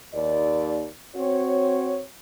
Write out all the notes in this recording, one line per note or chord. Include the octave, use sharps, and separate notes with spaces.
D#2 D5
C4 F#4 C#5